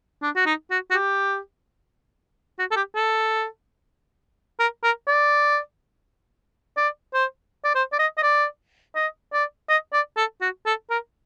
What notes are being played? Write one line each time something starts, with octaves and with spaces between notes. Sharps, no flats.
D4
F#4
D#4
F#4
F#4
G4
F#4
A4
G4
A4
A#4
A#4
D5
D5
C5
D5
C5
D5
D#5
D#5
D5
D#5
D5
D#5
D5
A4
F#4
A4
A#4